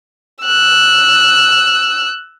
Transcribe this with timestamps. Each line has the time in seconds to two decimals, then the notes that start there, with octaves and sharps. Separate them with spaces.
0.45 E6 F#6